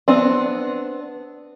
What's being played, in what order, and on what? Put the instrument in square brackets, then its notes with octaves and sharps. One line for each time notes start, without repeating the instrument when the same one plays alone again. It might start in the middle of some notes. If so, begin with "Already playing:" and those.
[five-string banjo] B3 C4 D4